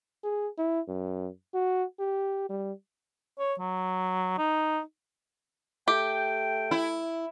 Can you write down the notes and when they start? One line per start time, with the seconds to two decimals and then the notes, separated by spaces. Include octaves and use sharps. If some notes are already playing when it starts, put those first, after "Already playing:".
0.24 G#4
0.58 E4
0.88 F#2
1.54 F#4
2.00 G4
2.50 G3
3.39 C#5
3.60 F#3
4.39 D#4
5.88 A3 G4 G5
6.71 E4